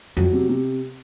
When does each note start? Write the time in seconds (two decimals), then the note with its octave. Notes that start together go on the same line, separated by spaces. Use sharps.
0.17 F2 F#3
0.33 C3
0.49 C3